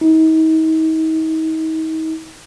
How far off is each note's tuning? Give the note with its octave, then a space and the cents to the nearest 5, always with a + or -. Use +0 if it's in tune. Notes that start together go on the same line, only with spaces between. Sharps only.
D#4 +40